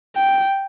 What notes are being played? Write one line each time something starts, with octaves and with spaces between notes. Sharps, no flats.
G5